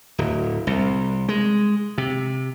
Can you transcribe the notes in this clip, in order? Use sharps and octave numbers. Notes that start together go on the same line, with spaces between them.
D1
C2
G#3
C3